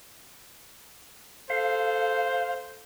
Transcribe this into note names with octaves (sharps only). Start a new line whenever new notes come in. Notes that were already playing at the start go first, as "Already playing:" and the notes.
A4 C5 F5